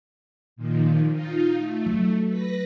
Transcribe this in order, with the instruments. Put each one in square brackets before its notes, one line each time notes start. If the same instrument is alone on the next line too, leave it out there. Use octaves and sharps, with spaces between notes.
[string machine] A#2 D#3 F3
D#4 F4
A3
[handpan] F#3
[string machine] B4 B5 A#6